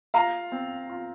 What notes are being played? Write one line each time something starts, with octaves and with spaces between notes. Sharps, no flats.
F4 F5 A#5
C4
F4